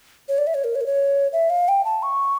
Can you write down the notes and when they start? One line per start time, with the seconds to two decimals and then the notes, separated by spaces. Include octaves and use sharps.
0.28 C#5
0.38 D5
0.47 E5
0.54 C#5
0.64 A#4
0.75 C#5
0.81 A#4
0.86 C#5
1.33 E5
1.50 F5
1.68 G5
1.85 A5
2.03 C#6